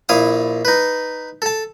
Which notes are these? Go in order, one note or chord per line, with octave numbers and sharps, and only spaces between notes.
A#1 E4 F5 D#6
D#4 B4
A4 A5